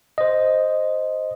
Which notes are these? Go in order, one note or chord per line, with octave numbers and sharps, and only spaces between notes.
C5 D#5